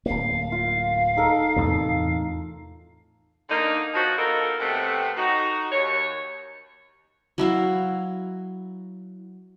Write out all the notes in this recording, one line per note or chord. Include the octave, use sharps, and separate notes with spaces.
D1 A#3 F5
F4
D#4 A4 A#4
E2 A2 C3
D3 A#3 D#4
F3 F#4
B3 D#4 F4 A4 A#4
C3 A3 B3 C4
D#4 F#4
D#2 C#5
F#3 E4 F#4 F5